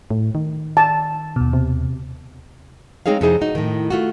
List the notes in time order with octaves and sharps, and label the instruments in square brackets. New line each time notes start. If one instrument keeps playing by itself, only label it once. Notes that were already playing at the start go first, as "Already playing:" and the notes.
[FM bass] A2
D#3
[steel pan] A5
[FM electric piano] D#2 B2
[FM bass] C3
[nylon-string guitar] G#3 C4 D#4 G#4 C#5 F5
F2 C3 D#4 E4 G#4 C5
D#4 F#4
A2 D#3
A3 F4 F#4